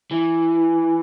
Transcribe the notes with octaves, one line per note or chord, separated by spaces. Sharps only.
E3